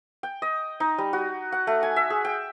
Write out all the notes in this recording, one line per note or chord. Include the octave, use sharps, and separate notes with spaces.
G5
D#5
D#4
G3
F#4
F#5
A3
G#5
E5
G#4
G5